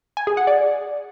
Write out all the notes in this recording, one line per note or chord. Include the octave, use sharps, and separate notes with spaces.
G#5
G#4
F#5
D5